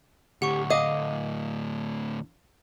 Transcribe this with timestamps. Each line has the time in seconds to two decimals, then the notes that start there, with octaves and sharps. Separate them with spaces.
0.42 D2 A2 G4 F#5 C#6
0.70 D#5 F5 D6 D#6